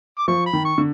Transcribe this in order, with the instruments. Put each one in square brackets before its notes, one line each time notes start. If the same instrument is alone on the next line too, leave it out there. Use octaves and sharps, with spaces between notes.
[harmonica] D6
[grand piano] F3 [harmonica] C#6
[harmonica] B5
[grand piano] D#3
[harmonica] C#6
[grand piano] D3